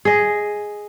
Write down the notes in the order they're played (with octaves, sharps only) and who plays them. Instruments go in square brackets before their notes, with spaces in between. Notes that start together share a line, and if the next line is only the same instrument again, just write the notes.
[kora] G#4 D#5